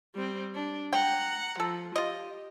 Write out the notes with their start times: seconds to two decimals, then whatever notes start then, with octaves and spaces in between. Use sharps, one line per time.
0.15 G3 C4
0.55 D4
0.93 F#5 G5 A#5
1.60 F3 A4
1.96 F4 G4 D#5